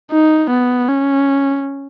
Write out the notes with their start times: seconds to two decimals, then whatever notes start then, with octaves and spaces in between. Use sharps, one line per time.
0.11 D#4
0.50 B3
0.88 C#4